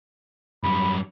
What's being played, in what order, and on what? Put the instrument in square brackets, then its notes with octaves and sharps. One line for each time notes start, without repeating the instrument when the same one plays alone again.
[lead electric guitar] F#2 G3 [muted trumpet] B5